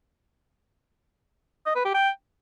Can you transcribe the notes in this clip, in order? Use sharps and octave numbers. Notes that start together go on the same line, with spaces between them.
D#5
B4
G4
G5